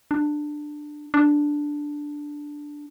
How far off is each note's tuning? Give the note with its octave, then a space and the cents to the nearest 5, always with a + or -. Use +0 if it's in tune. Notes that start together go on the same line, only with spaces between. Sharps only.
D4 +15
D4 +0